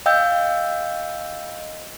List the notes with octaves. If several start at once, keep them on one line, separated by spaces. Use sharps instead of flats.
D#5 F5 G5 E6 G6